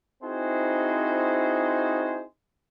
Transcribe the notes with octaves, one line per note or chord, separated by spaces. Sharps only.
C4 D#4 E4 F#4 G#4 C5